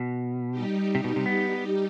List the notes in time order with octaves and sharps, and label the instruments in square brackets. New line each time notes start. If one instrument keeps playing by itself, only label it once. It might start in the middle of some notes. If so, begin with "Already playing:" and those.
Already playing: [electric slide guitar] B2
[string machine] G3 D#4 G4
[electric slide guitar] C3
B2
C3
B3